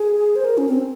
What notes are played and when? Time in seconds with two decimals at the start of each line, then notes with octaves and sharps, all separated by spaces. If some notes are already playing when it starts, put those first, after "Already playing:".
Already playing: G#4
0.36 C5
0.45 A#4
0.58 C#4
0.69 C4